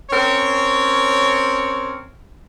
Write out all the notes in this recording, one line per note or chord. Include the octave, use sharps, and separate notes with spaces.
C4 C#4 A#4 C#5